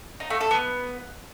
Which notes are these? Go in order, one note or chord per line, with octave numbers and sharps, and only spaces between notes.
D#4
A3
A4
B3